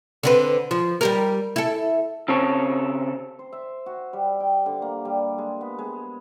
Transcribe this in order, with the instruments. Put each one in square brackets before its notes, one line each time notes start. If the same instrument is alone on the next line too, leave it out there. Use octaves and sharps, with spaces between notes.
[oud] D3 C4 B4
F3
G3 G4 A#4
E4 A4
[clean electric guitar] C#3 C4 A4 C#5
[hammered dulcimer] C5
E5
F#4
G3
G5
D3
A#3
G3
G#3
B3
G#3